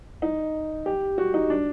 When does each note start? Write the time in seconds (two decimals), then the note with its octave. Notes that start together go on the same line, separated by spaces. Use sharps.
0.22 D#4
0.86 G4
1.18 F#4
1.34 D#4
1.50 D4